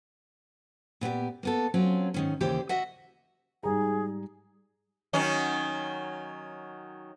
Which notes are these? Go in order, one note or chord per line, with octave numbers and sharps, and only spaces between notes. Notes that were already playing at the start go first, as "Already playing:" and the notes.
A#2 B3 G4 D5
A#3 B3 A4
F#3 C4 C#4 F4
G#2 D#3 C#4
D#2 C#3 E3 G4 C5 D5
F#4 D#5 E5 F#5
G#2 G3 G#4 A#5
D#3 F#3 C#4